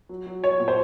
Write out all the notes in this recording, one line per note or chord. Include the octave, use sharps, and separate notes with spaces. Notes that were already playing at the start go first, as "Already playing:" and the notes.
F#3
F#3
F#3 C#5
A#2
C5